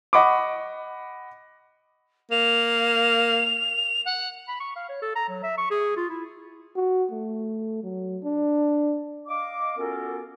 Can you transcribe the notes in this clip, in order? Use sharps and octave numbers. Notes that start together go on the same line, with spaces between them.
D#5 F#5 B5 C#6 D6
A#3 F7
F#5
B5
C#6
F5
C#5
A4
A#5
F#3
E5
C#6
G#4
F4
E4
F#4
A3
F#3
D4
D#5 F5 D6
B3 C#4 F4 F#4 A4 A#4